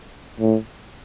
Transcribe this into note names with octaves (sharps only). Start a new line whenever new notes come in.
A2